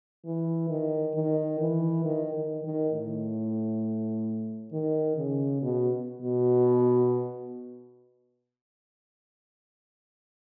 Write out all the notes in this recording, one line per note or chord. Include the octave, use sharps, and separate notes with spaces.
E3
D#3
D#3
E3
D#3
D#3
D#3
A2
D#3
C#3
B2
B2